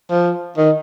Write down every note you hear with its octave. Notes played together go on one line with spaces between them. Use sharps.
F3
D#3